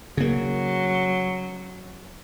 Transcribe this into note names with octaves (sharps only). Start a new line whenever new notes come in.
C#3 F#3 A#3